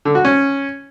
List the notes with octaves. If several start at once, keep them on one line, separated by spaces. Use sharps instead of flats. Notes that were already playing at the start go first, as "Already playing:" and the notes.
D3
F#4
C#4